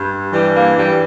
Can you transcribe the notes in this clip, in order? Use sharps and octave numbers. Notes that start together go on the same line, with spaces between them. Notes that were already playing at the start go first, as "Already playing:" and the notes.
Already playing: G2
E3 G3
A#3
G2 G3